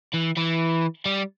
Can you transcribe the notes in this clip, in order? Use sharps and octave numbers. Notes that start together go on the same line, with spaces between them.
E3
E3
G3